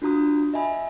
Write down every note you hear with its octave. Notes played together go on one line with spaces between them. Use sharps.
D4 F4 F#4 A#5 D#6
D#5 E5 G#5 B5